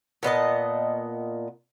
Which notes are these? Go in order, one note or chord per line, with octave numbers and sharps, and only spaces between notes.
A#2 B3 D#5 A5